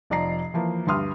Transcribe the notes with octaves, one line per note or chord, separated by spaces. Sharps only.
F1 F3 D5 D#5 A#5 C7
E3 F3 A#3
D2 G2 G4 C6 D#6 F6